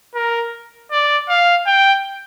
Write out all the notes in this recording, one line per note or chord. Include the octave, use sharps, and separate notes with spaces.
A#4
D5
F5
G5